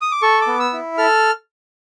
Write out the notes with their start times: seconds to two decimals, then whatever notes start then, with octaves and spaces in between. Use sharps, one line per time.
0.01 D#6
0.11 D6
0.22 A4 C#6
0.42 D6
0.48 B3
0.60 E6
0.73 E4
0.98 A4 F6